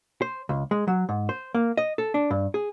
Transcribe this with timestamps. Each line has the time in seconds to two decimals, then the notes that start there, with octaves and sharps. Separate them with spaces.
0.22 C5
0.49 C#2
0.71 G#3
0.88 F#3
1.09 G#2
1.29 C5
1.55 A#3
1.77 D#5
1.98 A4
2.14 D4
2.31 G2
2.54 G#4